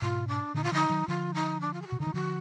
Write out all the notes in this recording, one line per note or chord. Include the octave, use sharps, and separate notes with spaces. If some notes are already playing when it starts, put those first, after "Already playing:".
G#2 B2 F4
D4
A#2 D3 D#4
F4
D3 F3 D#4
D#3 F#3
D3 F3 F4
D#4
D4
F4
G#4
F#4
B2
D3 D#4
D#3
D3 F3 F#4